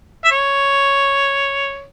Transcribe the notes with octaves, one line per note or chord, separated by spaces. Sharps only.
E5
C#5